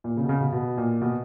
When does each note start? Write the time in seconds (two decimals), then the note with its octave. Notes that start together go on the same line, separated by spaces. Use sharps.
0.04 A#2
0.17 C#3
0.24 B2
0.29 C#3
0.41 B2
0.52 B2
0.78 A#2
1.01 B2